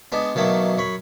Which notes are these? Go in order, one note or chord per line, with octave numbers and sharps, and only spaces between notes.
G#3 B3 D4
B2 D#3 F#3 A3 A#3
F#2 C#5 B5